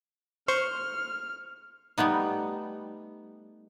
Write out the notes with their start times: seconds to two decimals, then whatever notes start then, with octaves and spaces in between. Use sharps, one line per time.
0.48 C5 C6 C#6 F6
1.98 G3 A3 B3 D#4